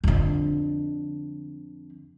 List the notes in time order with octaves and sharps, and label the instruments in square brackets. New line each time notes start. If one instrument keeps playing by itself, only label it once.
[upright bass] F2 D3